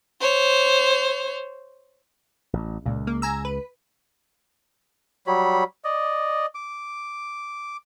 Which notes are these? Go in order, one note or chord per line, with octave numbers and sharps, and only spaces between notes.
C5 C#5
A1
C#2 A#2
A#3
G#5 A#5 E6
B4
F#3 G3 C#5 B5
D5 D#5
D6